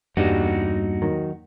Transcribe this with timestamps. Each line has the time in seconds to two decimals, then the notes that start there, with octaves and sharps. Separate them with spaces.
0.17 E2 G2 E3 G3 A#3 D#4 F#4
1.02 D#3 F#3